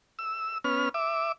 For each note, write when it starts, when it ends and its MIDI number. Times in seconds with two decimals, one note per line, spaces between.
0.19 0.58 88
0.64 0.89 59
0.64 0.89 61
0.64 0.89 89
0.94 1.32 76
0.94 1.32 86